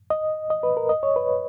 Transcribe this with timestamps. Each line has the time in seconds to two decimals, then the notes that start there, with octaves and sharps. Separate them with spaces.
0.10 D#5
0.50 D#5
0.63 B4
0.77 A#4
0.89 D#5
1.03 C#5
1.16 B4